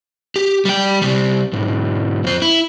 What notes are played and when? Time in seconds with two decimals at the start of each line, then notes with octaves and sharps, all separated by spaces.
0.36 G4
0.65 G3 G5
1.02 C2 G3
1.53 B1 G#2
2.24 F2 C5
2.42 E4